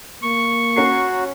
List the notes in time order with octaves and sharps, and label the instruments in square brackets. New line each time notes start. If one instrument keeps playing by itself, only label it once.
[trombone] A#3 [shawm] C#6
[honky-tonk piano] C#4 A#5 C7 [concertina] F#4